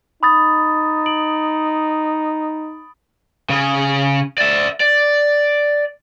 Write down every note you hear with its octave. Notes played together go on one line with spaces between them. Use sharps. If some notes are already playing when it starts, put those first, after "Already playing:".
D#4 B5 D#6 A6
D7 F#7
C#3 G#4
D5 E5
D5